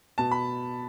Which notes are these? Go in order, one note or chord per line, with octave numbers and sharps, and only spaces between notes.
B2 A5
B5